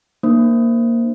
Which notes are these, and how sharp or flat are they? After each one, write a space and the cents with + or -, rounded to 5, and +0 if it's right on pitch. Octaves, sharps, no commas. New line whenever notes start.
A#3 +0 D4 +45 C5 +0